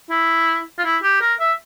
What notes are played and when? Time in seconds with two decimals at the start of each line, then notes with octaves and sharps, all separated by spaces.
0.10 E4
0.78 F4
0.84 E4
1.03 G4
1.21 A#4
1.40 E5